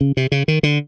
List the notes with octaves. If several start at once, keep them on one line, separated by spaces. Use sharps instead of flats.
C#3
C3
C#3
D#3
D3